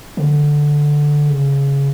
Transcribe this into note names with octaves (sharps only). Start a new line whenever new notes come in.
D3
C#3